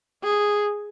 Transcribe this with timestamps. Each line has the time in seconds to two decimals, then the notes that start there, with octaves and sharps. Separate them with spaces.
0.23 G#4